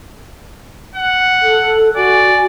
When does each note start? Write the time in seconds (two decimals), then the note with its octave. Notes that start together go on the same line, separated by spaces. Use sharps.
0.95 F#5
1.43 A4
1.96 F#4 D5 G#5